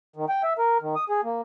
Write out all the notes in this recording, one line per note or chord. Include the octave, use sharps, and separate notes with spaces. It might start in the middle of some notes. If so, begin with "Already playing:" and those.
D#3
G5
E5
A#4
D#3
D#6
G#4
A#3